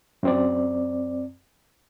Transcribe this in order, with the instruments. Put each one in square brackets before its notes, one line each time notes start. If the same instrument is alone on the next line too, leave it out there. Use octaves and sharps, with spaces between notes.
[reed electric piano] F#2 C4 D5